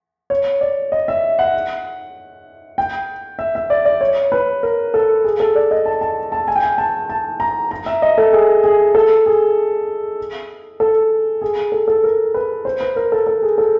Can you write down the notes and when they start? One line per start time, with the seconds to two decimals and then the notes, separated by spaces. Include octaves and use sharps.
0.30 C#5
0.61 D5
0.92 D#5
1.08 E5
1.39 F#5
2.78 G5
3.39 E5
3.55 E5
3.70 D5
3.85 D5
4.01 C#5
4.32 B4
4.63 A#4
4.94 A4
5.24 G#4
5.40 A4
5.55 D5
5.71 D#5
5.86 A5
6.01 A5
6.32 A5
6.48 G#5
6.56 G5
6.63 G#5
6.78 A5
7.09 A5
7.40 A#5
7.71 A#5
7.86 E5
8.02 D#5
8.18 A4
8.33 G#4
8.64 G#4
8.95 A4
9.26 G#4
10.80 A4
11.42 G#4
11.72 A4
11.88 A4
12.04 A#4
12.34 B4
12.65 C5
12.81 B4
12.96 A#4
13.12 A4
13.27 A4
13.42 G#4
13.58 A4